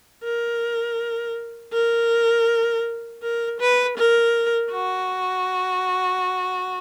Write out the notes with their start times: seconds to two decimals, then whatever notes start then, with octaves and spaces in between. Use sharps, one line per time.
0.24 A#4
1.73 A#4
3.23 A#4
3.61 B4
3.98 A#4
4.72 F#4